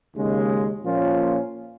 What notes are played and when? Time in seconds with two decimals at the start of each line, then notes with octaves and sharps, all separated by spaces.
0.15 D#2 C#3 G#3
0.83 A#2 F3 A#3 C#4 F4